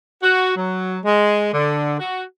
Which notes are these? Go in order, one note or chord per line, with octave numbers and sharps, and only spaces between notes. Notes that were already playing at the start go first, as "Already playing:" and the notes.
F#4
F#3
G#3
D3
F#4